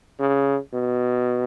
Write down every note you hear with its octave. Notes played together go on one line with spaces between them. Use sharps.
C#3
B2